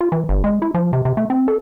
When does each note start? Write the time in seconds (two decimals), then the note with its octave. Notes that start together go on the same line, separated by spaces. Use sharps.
0.01 F4
0.12 E3
0.29 G1
0.44 G#3
0.62 E4
0.74 F3
0.93 C3
1.05 C3
1.17 A3
1.30 C4
1.48 A4